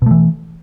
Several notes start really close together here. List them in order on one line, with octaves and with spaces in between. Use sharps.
B2 A3 E3